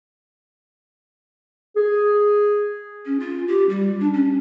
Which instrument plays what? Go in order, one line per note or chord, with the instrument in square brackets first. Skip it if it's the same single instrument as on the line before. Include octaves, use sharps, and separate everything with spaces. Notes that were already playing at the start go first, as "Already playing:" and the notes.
[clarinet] G#4
[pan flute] C#4
F4
G4
G3
D4
C#4